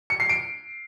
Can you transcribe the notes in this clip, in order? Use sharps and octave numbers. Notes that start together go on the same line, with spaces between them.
C#7
C7
D7